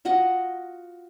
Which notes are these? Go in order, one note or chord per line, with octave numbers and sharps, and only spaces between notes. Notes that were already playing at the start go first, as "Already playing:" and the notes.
F4 F#4 D#5 F#5